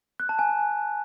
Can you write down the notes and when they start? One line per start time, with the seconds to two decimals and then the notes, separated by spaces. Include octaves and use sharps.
0.20 F#6
0.29 A5
0.39 G#5